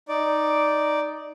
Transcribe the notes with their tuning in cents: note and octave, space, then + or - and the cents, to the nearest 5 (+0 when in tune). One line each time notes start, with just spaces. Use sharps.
D#4 +0 D5 +0